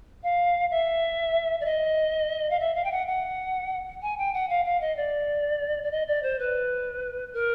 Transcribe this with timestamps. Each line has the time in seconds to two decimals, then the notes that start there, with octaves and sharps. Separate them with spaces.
0.23 F5
0.70 E5
1.60 D5
1.65 D#5
2.50 F5
2.59 E5
2.75 F5
2.84 G5
2.91 F#5
3.07 F#5
4.02 G#5
4.18 G5
4.33 F#5
4.49 F5
4.65 F5
4.81 D#5
4.96 D5
5.83 D5
5.91 D#5
6.07 D5
6.23 C5
6.39 B4
7.33 A#4